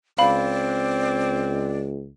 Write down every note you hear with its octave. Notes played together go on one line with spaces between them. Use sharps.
C#2 C4 D5 F5 B5